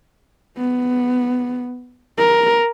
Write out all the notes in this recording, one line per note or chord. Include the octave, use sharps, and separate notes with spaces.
B3
A#4